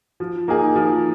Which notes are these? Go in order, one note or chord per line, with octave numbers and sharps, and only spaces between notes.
F3
A#3 D#4 G#4
F3